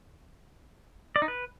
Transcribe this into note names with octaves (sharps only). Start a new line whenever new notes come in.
D5
D#4
B4